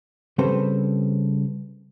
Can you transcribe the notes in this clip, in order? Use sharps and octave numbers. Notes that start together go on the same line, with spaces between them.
C#3 G3 C4 A4 B4 C5